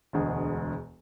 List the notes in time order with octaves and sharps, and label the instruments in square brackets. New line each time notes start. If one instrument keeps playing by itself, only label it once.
[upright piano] E1 D2 G#3 G#4